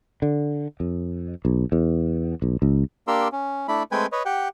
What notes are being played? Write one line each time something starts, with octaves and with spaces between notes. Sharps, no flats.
D3
F2
B1
E2
B1
C#2
A#3 D4 G4 A#4 C6 E6
C#4
A3 D4 E4 B5
G#3 A3 C4 B4 G5 G#5
B4 C#5 D#5
G4 F#5 G5